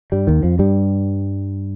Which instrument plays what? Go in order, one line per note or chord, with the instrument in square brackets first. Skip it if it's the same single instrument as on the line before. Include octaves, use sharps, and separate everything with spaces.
[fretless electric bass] G2 G3
D#2 D#3
F2 F3
G2 G3